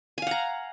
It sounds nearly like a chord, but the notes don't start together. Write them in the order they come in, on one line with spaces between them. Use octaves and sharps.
G#5 F5 F#5 A#5